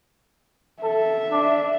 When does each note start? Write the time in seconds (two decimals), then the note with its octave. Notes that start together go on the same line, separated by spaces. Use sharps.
0.83 A4 E5
1.32 D4